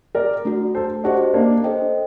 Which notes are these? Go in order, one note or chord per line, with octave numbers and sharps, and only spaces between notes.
A#4 D5
A3 D4 F#4
A4 C5
D4 F#4 G4 C5 D#5
A#3 D4
D4 A4 C5 D#5 G5